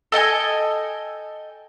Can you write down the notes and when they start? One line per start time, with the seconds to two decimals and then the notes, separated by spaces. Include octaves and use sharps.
0.12 A4 D#5 G5 G#5